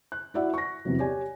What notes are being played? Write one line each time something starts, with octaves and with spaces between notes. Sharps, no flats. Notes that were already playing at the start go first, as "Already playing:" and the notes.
F#6
E4 F#4 D5 E5 F#5
C#6 A#6
E2 C3 F#3
G4 C#5 D5 G#5